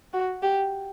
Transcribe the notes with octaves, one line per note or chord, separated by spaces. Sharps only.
F#4
G4